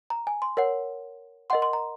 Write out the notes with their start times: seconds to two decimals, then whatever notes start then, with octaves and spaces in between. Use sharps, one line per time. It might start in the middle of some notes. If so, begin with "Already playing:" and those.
0.10 A#5
0.27 G#5
0.42 C6
0.57 A#4 C#5 F#5
1.50 A#4 D#5 F#5 C6
1.62 C6
1.73 A#5